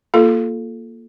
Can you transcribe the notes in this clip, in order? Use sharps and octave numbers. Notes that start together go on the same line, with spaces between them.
A#3 F4 A4